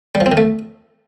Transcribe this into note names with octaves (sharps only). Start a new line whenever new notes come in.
G3
F3
C4
D#3
A3